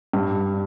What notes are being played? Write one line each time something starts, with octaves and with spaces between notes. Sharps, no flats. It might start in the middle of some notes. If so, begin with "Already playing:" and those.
G2